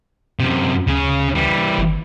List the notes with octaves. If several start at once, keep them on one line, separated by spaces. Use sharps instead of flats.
F#2 C3
D2 C#3 C#4
E3 G3
G1